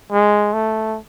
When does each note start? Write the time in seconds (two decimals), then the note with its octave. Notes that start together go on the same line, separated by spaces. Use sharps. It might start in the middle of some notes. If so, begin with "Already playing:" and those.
0.12 G#3
0.53 A3